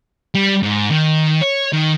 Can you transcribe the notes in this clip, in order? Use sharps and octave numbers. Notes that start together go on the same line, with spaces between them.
G3
G#2
D#3
C#5
D#3